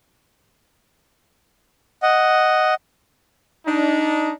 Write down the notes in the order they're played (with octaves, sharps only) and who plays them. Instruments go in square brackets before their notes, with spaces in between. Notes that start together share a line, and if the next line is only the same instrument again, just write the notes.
[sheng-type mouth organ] D#5 F#5
[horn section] D4 D#4